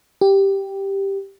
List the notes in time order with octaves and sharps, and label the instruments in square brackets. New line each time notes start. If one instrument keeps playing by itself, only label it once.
[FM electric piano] G4